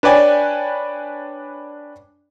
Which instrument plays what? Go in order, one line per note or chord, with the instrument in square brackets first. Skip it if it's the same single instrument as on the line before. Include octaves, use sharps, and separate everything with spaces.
[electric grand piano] D4 B4 C#5 D5 G5 G#5